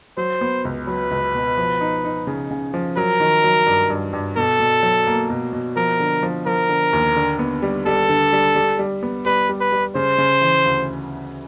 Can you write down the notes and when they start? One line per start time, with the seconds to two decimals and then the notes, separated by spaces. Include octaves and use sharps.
0.17 F#3 C5
0.41 B3
0.65 C#2
0.87 F#3 B4
1.11 C#2
1.35 B2
1.57 F3
1.81 D#4
2.04 D#4
2.27 C#3
2.51 C#3
2.74 F3
2.97 F#3 A#4
3.20 D#3
3.44 F#3
3.66 G2
3.90 G2
4.13 G2
4.36 B2 A4
4.60 B2
4.83 F#3
5.07 A#3
5.30 B2
5.53 B2
5.77 F3 A#4
6.00 D3
6.23 F3
6.46 F3 A#4
6.69 D3
6.93 D#2
7.16 D3
7.39 B3
7.62 G3
7.86 G3 A4
8.09 D3
8.33 G3
8.55 G3
8.79 G3
9.03 B3
9.25 G3 B4
9.49 G3
9.60 B4
9.72 G3
9.95 C#3 C5
10.18 C#3
10.41 E3
10.66 D2